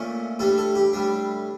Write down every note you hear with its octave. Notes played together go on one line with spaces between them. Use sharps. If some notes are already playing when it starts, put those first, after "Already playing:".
Already playing: A#2 A3 C#4 D5
A2 G3 D4 A4
A4
G4
A2 G3 D4